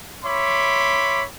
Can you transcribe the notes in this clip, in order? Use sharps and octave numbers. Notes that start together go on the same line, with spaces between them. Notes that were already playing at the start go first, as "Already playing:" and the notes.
C#5 E5 B5 C6 D6